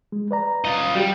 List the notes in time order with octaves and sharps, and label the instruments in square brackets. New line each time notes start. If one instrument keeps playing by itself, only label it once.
[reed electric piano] G#3
B4 D5 A#5
[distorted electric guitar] F4 D#5
[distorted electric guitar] G3 [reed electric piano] F#4 G4